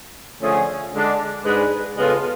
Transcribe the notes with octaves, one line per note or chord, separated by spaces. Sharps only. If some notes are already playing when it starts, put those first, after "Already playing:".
D3 F3 A3 C#4 G#4
D3 G#3 D4
G#2 G#3 D4 G#4 B4
C#3 G#3 B3 F4 A4